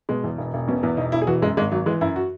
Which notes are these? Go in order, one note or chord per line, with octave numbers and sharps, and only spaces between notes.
B2 G#3
E2
E1
E1
B2 C#4
E2 B3
E1 D#4
E1 E4
G#4
E3 F#4
F#2 G#3
G#1 G#3
G#1 F#3
E3 G#3
F#2 E4
F#4